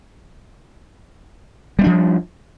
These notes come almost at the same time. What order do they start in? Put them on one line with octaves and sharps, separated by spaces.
G3 A#3 D4 F3